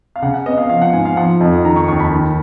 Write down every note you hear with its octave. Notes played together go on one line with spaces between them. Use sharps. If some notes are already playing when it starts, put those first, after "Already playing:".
F5
C#3 F#5
F#5
B3 D#5
F5
F3 F5
F#5
G#2 G#5
F5
F3 F#5
F2
D#3 A#5
C#6
D#2 C#6
B5
D#3